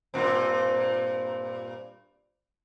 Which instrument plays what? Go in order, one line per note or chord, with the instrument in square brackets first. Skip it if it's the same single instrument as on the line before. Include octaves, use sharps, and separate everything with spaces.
[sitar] G2 A#2 C4